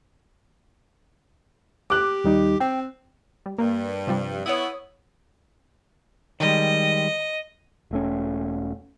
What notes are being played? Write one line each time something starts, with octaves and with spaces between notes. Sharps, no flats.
G4 D6 F#6
D#2 G3 D#4
C4 G5
G3
G2 A#3
C3 F3 G3
B3 E4 C#5 D#6
D#3 G3 G#3 D#5
E1 A3 C#4